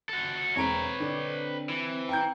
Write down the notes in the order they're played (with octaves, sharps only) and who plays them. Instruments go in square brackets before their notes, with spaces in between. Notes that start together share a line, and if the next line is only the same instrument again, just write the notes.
[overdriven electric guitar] F#4 A4
[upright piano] E1 A#5 D7 [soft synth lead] C4 [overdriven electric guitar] B4 C#5
[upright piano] D3 D4
[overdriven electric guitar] E3
[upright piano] G5 A#5 G6